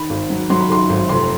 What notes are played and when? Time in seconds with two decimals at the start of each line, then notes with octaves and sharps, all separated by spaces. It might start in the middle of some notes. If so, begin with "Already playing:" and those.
Already playing: D#3 B5
0.10 G#1
0.30 F#3
0.50 F#3 C6
0.61 B5
0.69 D#3 C6
0.90 G#1
1.09 F1 C6